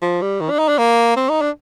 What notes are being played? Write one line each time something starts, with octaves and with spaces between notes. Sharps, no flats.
F3
G3
D#3
D4
D#4
D4
A#3
C4
D#4
D4